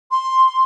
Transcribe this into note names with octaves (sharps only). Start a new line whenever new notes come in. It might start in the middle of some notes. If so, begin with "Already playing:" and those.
C6